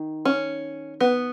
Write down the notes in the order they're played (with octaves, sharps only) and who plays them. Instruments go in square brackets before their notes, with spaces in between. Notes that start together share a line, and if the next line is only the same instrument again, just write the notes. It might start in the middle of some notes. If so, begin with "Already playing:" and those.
Already playing: [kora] D#3
[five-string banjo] C#4
B3